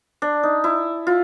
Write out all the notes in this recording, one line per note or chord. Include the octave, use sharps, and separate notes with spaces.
D4
D#4
E4
F4